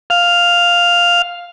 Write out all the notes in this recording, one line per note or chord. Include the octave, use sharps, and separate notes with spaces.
F5